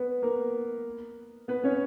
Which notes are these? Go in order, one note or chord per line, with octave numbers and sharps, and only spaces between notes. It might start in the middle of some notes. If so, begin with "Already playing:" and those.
Already playing: B3 B4
A#3 A#4
B3 B4
C#4 C#5